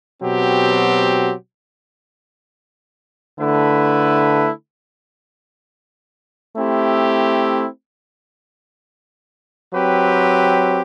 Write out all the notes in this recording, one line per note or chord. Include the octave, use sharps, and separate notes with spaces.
B2 F#3 C4 G4
D3 A3 E4 B4
A3 C4 E4 G4
F#3 C4 G4 B4